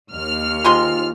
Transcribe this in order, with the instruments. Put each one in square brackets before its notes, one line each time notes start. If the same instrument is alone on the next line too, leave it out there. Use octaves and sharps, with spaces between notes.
[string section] D#2 F6
[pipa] C3 G#3 C6 [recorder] F4